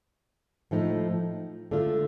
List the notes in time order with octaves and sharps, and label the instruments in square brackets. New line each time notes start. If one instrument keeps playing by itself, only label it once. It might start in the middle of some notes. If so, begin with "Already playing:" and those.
[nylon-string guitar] A2 F3 A3 D#4
D3 A3 D4 F4